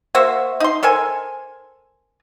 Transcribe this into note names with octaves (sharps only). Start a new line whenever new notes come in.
A#3 F#4 C5 E5
D#4 C6
A4 A#4 C5 G#5